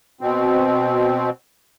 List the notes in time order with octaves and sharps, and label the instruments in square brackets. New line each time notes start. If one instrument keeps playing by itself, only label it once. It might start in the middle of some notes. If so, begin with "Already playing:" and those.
[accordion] B2 C4